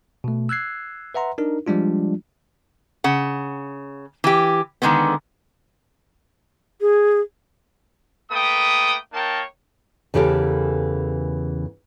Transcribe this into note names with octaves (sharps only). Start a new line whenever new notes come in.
B2 A3
E6 F#6 G#6 C7
B4 E5 F#5 A#5 C6
D4 D#4 A#4
F3 G3 G#3 D4 F4
C#3 F#5
E3 G4
D3 D#3 G#3 A3 B3
G#4
A3 A#3 B4 G5 D#6
A#3 D#4 A#4 C#5 G5 A5
E2 C#3 E3 G4 A4 A#4